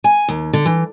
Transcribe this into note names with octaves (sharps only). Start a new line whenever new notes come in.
G#5
D#2
D3
E3